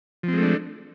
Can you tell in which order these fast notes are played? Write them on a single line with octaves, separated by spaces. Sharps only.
F3 C4 G#3 A3 D4